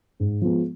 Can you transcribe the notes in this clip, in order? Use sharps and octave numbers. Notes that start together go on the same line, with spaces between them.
G#2
F3 G#3 B3